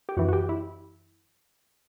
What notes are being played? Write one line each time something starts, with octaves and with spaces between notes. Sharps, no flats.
G4
F#2 E3 F#4
F#4
G4
E4